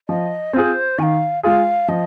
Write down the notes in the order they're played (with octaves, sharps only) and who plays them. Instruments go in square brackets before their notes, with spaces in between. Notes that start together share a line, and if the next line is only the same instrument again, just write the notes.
[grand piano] F3 [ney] D#5
[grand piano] C4 F4 G#4 [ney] C5
[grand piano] D#3 [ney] G#5
[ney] F5
[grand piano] G#3 F4 G#4 [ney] F5
[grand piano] F3 [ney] D#5